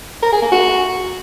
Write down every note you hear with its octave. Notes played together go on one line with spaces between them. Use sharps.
A#4
G#4
A#3
F#4